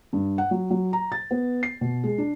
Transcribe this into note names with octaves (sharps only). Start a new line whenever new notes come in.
G2
F#5
F#3
F#3
A#5
A6
B3
C7
B2
G#3
D4